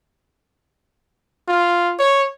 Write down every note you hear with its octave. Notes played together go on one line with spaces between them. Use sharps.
F4
C#5